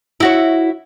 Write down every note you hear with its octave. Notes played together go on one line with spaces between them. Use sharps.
E4 F#4 C#5